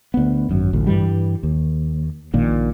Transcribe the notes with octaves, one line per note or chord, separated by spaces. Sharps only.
D2 B3
G#1 F#2
A1 D2
G2 E3 G3
D#2
A#1 A#2 D#3